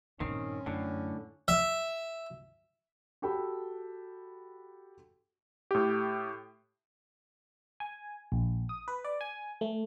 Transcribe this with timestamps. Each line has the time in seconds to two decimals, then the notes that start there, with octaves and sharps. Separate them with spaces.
0.20 A#1 G2 D#3 C4 C#4
0.66 F#2 A2 D3
1.48 E5
3.22 F#4 G4 A4 G5 B5
5.71 A2 G4
7.80 G#5
8.32 A#1
8.69 D#6
8.88 B4
9.05 D5
9.21 G#5
9.61 A3